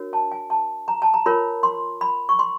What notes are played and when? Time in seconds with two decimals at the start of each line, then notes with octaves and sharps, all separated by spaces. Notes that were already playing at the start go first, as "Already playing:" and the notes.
Already playing: D4 F#4 A#4 C#5
0.13 A5
0.32 G#5
0.50 A5
0.88 A#5
1.02 A5
1.14 A#5
1.26 F4 A#4 C#5 B5
1.63 C6
2.01 B5
2.29 C#6
2.39 C6